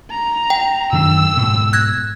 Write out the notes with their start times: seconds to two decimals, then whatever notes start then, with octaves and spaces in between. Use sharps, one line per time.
0.10 A#5
0.50 G5
0.93 F#2 D#3 D4 E6
1.37 G#2 B2
1.73 F#6 G#6 A#6